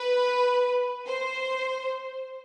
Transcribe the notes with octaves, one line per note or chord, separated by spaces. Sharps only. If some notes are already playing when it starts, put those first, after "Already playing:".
Already playing: B4
C5